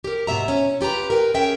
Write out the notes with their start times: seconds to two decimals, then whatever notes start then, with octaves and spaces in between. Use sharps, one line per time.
0.04 G4 A#4
0.27 G#2 B2 E5 A#5
0.48 C#4
0.81 F4 G4 B4 A#5
1.10 A#4 B4 G5 G#5
1.34 C#4 G#4 A#4 E5 G5